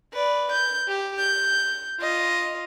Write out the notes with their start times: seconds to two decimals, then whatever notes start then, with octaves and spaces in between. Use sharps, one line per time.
0.13 B4 D5
0.52 G6
0.88 G4
1.19 G6
2.00 F4 D#5